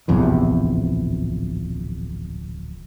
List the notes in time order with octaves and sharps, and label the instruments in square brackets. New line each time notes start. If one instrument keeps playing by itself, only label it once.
[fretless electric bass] D1 A#1 E2 C3